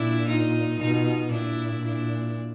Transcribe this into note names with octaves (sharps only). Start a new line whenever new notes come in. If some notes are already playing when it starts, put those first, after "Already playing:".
Already playing: A#2 D4 E4
D#4 F4
B2 D#4 F4
A#2 D4 E4
D4 E4